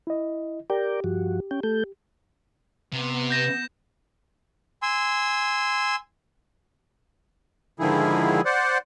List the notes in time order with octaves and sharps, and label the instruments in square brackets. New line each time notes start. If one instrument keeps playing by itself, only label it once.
[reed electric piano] E4 D#5
[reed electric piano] G4 [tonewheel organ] A#4 D5 G5
[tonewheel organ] G2 F3 F#4
C#4 G5
A3 A4 G6
[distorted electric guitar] C3 [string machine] B3
[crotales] G6 A#6 E7
[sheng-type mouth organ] G#5 C6 E6
[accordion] G#2 D3 D#3 F3 E4 G#4
C5 D5 F#5